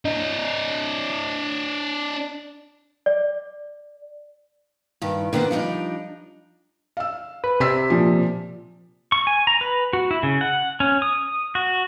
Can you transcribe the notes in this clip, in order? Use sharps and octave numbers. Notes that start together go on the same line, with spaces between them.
D4 D#5
D5
G2 D#3
D3 D#3 B3 D4 C5
F3 G3 D4 D#4
F5 E6
B4
C3 C6 E6 B6
A#2 F3
C#6
G#5
A#5
B4
F#4
E4
C#3
F#5
C#4
D#6
F#4